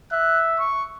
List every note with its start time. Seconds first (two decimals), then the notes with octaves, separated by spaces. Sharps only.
0.12 E5 F#6
0.59 C#6